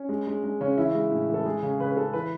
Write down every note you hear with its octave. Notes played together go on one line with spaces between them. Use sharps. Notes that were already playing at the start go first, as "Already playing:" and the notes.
Already playing: C#4
G#3
G#3
G#3
C#3 C#4
E3 E4
G#3
A2
E3 A4
G#3 G#4
C#3
C#3 B4
B4
C#3 A4
E3 B4